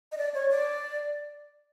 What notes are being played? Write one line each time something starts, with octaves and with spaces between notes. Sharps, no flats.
D#5
D5
C#5
D5